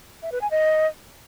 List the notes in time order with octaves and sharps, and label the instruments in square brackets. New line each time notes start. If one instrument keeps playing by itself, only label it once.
[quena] E5
B4
G#5
D#5